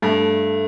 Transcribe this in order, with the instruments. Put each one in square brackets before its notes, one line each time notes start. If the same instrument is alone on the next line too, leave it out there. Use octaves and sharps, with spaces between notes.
[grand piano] G2 [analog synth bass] A3